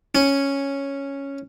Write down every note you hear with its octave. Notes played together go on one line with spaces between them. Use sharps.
C#4